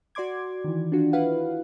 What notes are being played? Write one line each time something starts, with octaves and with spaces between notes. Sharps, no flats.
F#4 D5 C6 D6 G#6
D#3 E3
D4 F4 F#4
E4 B4 F5 F#5